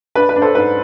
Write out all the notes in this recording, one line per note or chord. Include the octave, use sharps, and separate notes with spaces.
D4 B4
B4
D4
A4 C5
G#2 B4